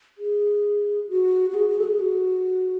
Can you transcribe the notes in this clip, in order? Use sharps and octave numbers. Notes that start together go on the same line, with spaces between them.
G#4
F#4
F#4
G#4
G#4
A4
G#4
F#4